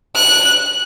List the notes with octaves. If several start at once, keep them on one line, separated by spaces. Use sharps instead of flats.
F#6